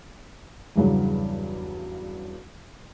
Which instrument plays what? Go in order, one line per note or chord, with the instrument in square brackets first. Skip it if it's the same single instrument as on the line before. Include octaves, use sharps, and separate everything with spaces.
[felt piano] E2 G2 C#3 F#3